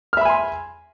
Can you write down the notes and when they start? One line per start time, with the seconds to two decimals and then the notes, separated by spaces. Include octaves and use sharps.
0.13 F6
0.17 E5
0.21 B5
0.25 G#5
0.29 C6